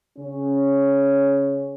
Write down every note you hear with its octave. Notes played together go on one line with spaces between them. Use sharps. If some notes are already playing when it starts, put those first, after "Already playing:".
C#3 C#4